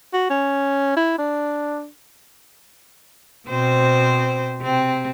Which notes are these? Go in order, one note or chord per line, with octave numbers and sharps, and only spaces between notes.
F#4
C#4
E4
D4
B2 C4 C5
C3 C4